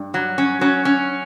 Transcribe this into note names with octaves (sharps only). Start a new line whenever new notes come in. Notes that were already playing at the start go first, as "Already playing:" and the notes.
Already playing: G2
F#3
C#4
F#3 C#4
C#4